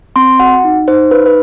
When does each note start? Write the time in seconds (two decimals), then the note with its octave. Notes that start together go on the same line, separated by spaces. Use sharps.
0.16 C4 C6
0.40 F#4 F#5
0.64 D#4
0.88 D#4 C5
1.11 D#4 B4
1.26 B4